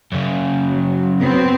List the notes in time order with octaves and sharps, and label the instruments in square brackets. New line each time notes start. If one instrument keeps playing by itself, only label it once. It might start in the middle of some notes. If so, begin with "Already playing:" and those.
[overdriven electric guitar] F#2 C#3
[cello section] F#3
F#3 B3 C4